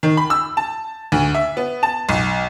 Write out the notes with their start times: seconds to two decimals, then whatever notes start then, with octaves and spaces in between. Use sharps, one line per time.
0.03 D#3
0.17 B5
0.30 E6
0.57 A5
1.12 D2
1.35 E5
1.57 B3
1.83 A5
2.09 B1